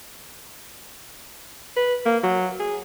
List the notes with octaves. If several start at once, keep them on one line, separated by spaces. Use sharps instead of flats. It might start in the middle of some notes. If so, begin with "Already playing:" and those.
B4
A#3
F#3
G#4